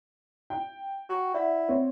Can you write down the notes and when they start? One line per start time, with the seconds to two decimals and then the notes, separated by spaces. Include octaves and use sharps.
0.50 G5
1.09 F#4
1.34 E4 D5 E5 F#5
1.68 C4 C#5